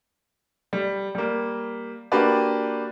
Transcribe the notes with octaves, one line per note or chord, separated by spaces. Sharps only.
G3
G3 A#3
A#3 D4 F#4 G4 B4 D5